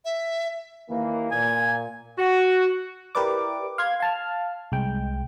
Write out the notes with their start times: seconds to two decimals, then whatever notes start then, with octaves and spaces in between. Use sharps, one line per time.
0.05 E5
0.89 D#2 E3 A#3
1.31 A#2 G#5
2.18 F#4
3.15 E4 G4 A#4 B4 D5 D6
3.78 F5 C6 G#6
4.00 F5 A5 F6
4.72 C2 G#3 G5